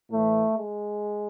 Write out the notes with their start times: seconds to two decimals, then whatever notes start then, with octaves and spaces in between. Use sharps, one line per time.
0.11 A2 E3 A3
0.56 G#3